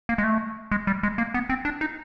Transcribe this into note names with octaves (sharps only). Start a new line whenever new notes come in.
A#3
G#3
A3
G#3
G3
G#3
A#3
B3
C4
D4
D#4